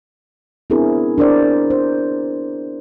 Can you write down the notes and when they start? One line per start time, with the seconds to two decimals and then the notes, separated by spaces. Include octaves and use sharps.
0.70 B3 C4 D4 E4 G#4 A#4
1.18 D4 A#4 C5 D5
1.70 C5